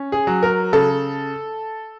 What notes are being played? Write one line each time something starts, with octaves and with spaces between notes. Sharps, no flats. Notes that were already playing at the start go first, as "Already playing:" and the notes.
Already playing: C#4
G#4
F#3
A#4
C#3 A4